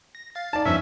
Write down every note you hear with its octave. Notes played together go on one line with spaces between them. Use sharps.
A#6
F5 A6
D#4 D5 A5
E2 G2 F3 C#4 E5